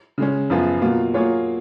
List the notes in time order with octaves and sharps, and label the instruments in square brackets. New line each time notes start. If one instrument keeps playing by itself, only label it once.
[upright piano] C#3 G#3 C#4
F#2 F3 B3 F4 G#4
B2 F#3 A#3 F4
F#3 A#3 F4 G#4 C#5